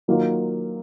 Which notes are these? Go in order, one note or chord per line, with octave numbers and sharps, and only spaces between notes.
D#3 F#3 A#3 F4